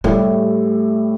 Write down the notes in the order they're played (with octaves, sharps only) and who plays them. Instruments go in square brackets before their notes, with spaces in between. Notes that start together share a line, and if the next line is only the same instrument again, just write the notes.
[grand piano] A2 G3 E4 G4 [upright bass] A3